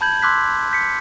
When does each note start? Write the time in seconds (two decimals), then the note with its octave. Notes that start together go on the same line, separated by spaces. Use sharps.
0.01 A5 B5 G6 G#6 F#7
0.22 C6 D6 E6 F#6 G#6 B6
0.72 G6 B6 C#7